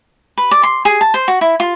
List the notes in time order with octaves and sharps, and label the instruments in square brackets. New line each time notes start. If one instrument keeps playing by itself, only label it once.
[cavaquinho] B4
D5
C6
G#4
A5
C5
F#4
E4
F4